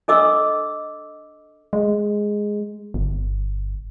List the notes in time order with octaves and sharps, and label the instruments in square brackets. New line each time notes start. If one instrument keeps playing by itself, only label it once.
[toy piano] D4 A4 D#5 D6 E6
[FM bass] G#3
G1